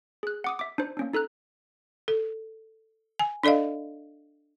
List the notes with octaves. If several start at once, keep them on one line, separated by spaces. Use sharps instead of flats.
G#4 F#6
F#5 D6 D#6
E5 D6
D4 D#4 C5
A#3 C#4 D4
D#4 A4 A#5 F#6
A4
G#5
D4 A4 D5 D#5 F5